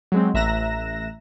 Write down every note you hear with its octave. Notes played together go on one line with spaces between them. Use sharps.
F#3 G#3 C4
A1 E5 A#5 F#6 A#6 E7